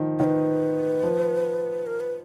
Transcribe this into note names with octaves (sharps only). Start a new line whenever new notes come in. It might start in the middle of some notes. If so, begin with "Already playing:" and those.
Already playing: D#3 F3
D#3 B4 C#5
F3
A#4
B4